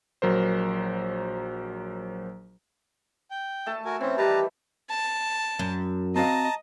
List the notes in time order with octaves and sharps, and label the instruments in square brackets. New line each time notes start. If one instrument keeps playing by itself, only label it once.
[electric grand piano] A#1 F#3 A#4 C5
[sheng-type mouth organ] G5
[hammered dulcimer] A3 A4 A5
[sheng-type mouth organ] F#4 A#4 G#5
[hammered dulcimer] E3 [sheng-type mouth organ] C4 C#4
[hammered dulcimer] D#3 G3 [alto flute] G4 [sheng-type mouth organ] B4 A5 A#5
[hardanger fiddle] A5
[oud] F#2
[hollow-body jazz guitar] C4 F#4 F5 [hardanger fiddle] D#5 [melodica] A5 A#5